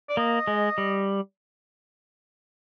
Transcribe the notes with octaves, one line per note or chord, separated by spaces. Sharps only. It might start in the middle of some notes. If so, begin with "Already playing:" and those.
D5
A#3 D#5
G#3
G3